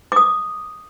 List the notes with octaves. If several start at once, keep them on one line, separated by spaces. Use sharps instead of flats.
D6 D#6